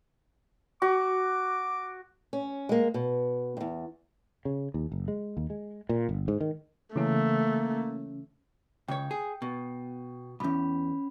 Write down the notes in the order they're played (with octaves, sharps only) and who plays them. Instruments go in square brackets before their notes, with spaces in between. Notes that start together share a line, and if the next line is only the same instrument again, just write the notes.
[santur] F#4 [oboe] D6
[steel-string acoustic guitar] C#4
G#3 A#3
B2
E2 G2
[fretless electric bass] C#3
D#2
F#1
G#3
D#2
G#3
A#2
G1
G#2
D#3
[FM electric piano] C#3 E3 C#4 [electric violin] A3 [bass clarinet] A#3
[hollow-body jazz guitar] C#2 C#3 C#5 [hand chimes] G5
[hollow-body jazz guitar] G#4
B2
[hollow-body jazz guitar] B1 E2 [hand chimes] C#4 B5